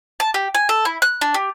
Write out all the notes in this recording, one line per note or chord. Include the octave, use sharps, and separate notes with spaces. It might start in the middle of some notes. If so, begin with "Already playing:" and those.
A5
G4
G#5
A4
E4
F#6
D4
G4